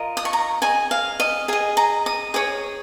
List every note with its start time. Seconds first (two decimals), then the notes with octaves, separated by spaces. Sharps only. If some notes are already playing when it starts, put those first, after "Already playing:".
Already playing: F4 A#4 D#5
0.17 D#6
0.25 C#6
0.33 A#5
0.62 G#4 D#5 G#5
0.91 F5
1.20 D#5
1.48 G#4 D#5 G#5
1.77 A#5
2.06 D#6
2.34 G#4 C#5 D#6